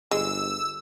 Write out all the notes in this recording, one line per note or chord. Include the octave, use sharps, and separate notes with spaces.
G1 G#3 E6